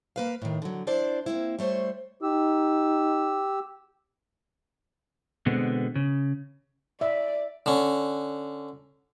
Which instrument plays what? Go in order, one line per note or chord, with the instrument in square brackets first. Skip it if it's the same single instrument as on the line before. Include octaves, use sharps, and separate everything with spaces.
[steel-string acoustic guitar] A#3 B4 F5
A2 D#3
D3 F#3
D4 E4 C5 D5
A#3 C4 E4
G3 A3 C5 C#5
[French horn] D#4 [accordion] G4 E6
[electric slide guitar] B2 D3 G#3 B3 C4
C#3
[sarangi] D5 [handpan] E5
[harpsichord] D3 C#4